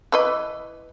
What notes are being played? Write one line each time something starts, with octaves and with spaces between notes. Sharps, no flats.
E3 B4 D#5